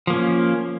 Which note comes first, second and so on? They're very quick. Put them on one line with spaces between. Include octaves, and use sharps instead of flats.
F3 A#3 C#4